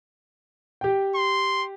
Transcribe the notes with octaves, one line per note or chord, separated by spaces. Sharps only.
G4 G5
C6